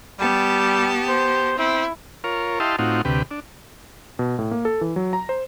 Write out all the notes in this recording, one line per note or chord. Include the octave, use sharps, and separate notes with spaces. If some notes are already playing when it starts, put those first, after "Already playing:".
G3 B3 G4 A5
C5
C4 E4
F4 A#4 C#5
E4 G4 D#5 F5 A5 C6
A2 C4 D#4 F4 F#4
D2 C3 G4 B4
D4
B2
A2
A#3
A4
E3
F#3
A#5
C5